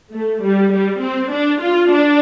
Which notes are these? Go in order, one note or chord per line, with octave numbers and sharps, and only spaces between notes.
A3
G3
G3
C4
D4
F4
D4